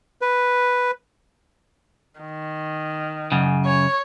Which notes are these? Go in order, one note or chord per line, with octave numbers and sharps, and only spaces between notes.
B4
D#3
F#2 C#3
C#5